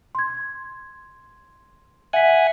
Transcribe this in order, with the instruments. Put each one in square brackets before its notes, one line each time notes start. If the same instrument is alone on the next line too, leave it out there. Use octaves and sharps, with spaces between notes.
[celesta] C6 G#6
[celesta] E5 B6 [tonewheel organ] F#5 G#5